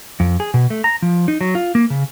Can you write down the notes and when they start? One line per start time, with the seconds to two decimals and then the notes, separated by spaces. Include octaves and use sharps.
0.20 F2
0.40 G#4
0.54 B2
0.70 A3
0.84 A#5
1.02 F3
1.28 D#4
1.41 F#3
1.55 F4
1.75 A#3
1.90 C#3